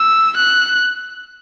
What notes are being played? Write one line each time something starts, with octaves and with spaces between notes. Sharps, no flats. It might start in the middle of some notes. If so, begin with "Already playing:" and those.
Already playing: E6
F#6